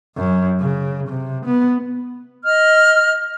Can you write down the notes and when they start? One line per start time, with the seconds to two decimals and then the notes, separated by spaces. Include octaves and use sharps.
0.16 F#2
0.60 C#3
1.08 C3
1.46 B3
2.44 D#5 F6